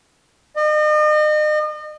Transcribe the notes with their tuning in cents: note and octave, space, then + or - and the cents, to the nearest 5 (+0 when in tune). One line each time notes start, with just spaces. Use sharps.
D#5 -40